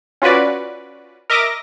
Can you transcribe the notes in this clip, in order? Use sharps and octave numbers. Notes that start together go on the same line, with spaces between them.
C#4 F4 F#4 B4 D5
A#4 D#5 E5 D6 D#6 A#6